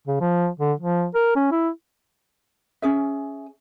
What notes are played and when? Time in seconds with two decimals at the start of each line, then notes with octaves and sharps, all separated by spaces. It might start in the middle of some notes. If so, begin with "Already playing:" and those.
0.07 C#3
0.20 F3
0.59 D3
0.80 F3
1.15 A#4
1.35 C#4
1.51 E4
2.82 C#4 G#4 E5